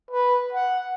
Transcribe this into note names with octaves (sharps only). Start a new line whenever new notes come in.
B4
F#5